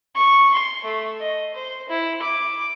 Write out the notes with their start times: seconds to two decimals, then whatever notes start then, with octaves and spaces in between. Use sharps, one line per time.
0.15 C#6
0.54 C6
0.84 A3
1.20 D#5
1.54 C5
1.89 E4
2.22 D6